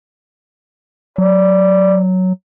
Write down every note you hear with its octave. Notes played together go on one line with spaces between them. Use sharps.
F#3 D5